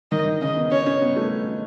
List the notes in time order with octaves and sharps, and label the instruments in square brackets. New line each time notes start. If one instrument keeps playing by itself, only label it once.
[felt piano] D#3 [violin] D#5
[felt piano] D#3
[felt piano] C#3 [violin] D#5
[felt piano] B3
[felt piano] C#4 [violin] C#5
[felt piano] C#4
B3
A3